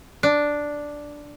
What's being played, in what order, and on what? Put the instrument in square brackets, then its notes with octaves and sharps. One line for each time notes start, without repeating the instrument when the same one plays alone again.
[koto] D4